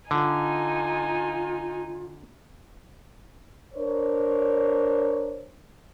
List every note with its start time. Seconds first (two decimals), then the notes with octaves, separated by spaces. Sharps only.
0.11 D3 D#4 F4 G#5
3.74 D4 A#4 C5 C#5